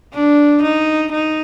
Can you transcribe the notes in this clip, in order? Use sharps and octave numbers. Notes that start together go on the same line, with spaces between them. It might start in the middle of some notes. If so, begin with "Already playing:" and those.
D4
D#4
D#4